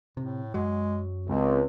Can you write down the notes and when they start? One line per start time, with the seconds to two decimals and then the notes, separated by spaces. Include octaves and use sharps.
0.17 A2 C3
0.54 F#2 F#3 G#3
1.27 C#2 C4